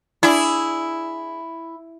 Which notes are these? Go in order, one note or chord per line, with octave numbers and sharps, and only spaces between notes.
D4 E4 G#4